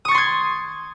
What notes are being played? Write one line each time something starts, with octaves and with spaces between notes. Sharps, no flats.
C6 C#6 D#6 G#6 A6